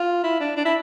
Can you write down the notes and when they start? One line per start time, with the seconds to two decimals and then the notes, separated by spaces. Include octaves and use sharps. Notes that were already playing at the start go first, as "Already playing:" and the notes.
Already playing: F4
0.23 E4
0.40 D4
0.57 D4
0.65 E4